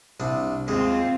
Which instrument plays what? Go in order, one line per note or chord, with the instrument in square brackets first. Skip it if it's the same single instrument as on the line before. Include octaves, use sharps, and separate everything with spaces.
[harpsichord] C2 D4
[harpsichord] D#2 G#3 [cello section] C4 F4